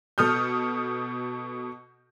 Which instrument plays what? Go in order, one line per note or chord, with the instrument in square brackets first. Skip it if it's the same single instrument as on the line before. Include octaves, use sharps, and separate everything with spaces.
[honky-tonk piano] B2 A4 D#6 F6 G6